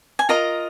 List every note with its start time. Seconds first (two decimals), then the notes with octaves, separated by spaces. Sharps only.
0.19 G#5
0.29 F4 A#4 D#5 A#5